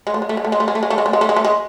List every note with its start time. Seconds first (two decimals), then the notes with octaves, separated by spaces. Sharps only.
0.07 G#3
0.14 A3
0.22 G#3
0.29 A3
0.37 G#3
0.44 A3
0.52 G#3
0.60 A3
0.68 G#3
0.75 A3
0.83 G#3
0.90 A3
0.98 G#3
1.06 A3
1.13 G#3
1.21 A3
1.29 G#3
1.36 A3
1.45 G#3